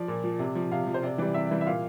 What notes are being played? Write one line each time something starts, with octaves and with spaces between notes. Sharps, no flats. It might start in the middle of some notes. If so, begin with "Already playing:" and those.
Already playing: F3 D5
A#2
F3
C3
F3
C3 F5
F3
C5
C3 D5
E3 G3 D5
C3 E5
E3 G3
E5
A#2 F5